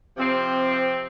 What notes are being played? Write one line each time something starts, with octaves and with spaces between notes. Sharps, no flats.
C3 F3 C4